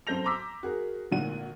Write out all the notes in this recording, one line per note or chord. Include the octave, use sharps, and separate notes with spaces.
F#2 C4 A4 G6 A#6 F7
A#5 C6 D6 E6 B6
F#4 G#4 A#4
G#1 D2 A#2 F#5 D#7